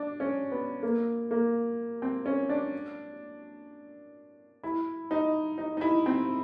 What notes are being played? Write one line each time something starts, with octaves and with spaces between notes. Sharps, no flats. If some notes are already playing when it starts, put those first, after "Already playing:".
Already playing: D4
C#4
B3
A#3
A#3
C4
C#4
D4
E4
D#4
D#4
D#4
E4
C4